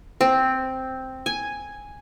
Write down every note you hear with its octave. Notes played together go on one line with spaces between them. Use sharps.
C4
G#5